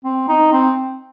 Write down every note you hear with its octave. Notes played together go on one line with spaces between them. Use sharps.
C4
D#4
C4